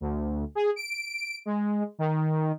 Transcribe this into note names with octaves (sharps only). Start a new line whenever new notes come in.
D2
G#4
D7
G#3
D#3